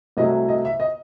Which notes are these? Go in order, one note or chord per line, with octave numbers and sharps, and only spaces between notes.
C2 C3 F#3 A3 E4 D#5
D#5
E5
D#5